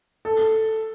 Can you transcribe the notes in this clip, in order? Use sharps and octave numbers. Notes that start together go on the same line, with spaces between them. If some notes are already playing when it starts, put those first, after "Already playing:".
A4